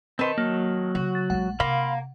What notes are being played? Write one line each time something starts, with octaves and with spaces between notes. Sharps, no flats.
D#3 C4 B4 A5 C6
F#3 A#3
C#3 F#4
A6
A#1 G#3 F#5
C3 A#3 F5 B5 C6